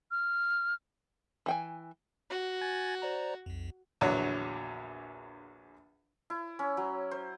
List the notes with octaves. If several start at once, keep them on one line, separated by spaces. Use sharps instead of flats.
F6
E3 G5 G#5
F#4
G#5 G#6 A6
C5 D5 A#5
B1 F2
A#1 E2 D3 F#3
E4
C#4
F#3
C5